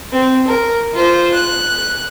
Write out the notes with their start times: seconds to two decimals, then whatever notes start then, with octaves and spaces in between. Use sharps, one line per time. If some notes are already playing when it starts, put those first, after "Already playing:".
0.12 C4
0.47 A#4
0.94 F4 C5
1.34 F#6